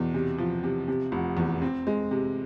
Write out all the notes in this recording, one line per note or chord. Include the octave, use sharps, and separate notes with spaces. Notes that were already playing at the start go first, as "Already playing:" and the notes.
Already playing: E2 B2
C3
F3
C3
C3
F1
E2
C4
G#3
C3